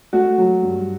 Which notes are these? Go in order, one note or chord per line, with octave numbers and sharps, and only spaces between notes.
A3 F#4
F#3
G2